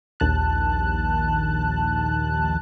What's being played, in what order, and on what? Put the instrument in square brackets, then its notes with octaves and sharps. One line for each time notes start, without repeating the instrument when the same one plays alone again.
[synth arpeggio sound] A#1 D#2 A5 F#6